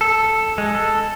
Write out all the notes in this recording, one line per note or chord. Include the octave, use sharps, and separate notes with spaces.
A4
G#3
A4